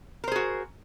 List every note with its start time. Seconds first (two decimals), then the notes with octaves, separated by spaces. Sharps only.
0.24 A#4
0.28 C5
0.32 G#4
0.36 F#4